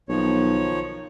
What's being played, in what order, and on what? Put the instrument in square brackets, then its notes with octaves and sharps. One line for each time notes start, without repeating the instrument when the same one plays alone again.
[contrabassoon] B1 [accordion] D#3 F3 C#5